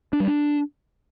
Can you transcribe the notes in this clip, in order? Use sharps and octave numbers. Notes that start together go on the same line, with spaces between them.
D4
G3
D4